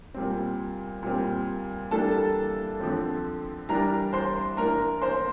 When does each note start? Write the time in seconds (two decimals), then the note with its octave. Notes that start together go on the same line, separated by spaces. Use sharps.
0.14 A#2 G3 C4
1.03 A#2 G3 C4
1.91 E3 G3 A#3 D4 A4 A5
2.80 D3 F3 C4
3.69 E3 G3 D4 A#4 A#5
4.13 C5 C6
4.57 E3 A#3 D4 A#4 A#5
5.02 C5 C6